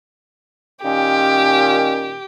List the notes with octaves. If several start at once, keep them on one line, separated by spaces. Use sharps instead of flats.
A#2 D#3 C#4 G4